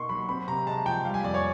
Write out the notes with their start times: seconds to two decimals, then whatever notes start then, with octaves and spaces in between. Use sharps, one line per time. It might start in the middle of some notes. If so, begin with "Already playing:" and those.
Already playing: B2 A#3 D#4 C6 C#6
0.09 F#3 B5
0.29 C4 B5
0.47 C3 A#5
0.66 G#3 A5
0.86 F3 G5
1.05 G3 F5
1.14 G#5
1.24 F2 D5
1.34 C#5